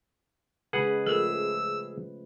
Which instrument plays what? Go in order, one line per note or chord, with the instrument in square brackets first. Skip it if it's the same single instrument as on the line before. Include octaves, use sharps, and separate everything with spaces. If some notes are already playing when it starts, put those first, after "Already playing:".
[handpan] C#3 G#3 B4 [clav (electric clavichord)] G#4 F#5
[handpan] F3 A3 [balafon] A4 A#4 [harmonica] E6